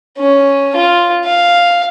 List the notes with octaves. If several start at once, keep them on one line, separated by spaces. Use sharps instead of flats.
C#4
F4
F5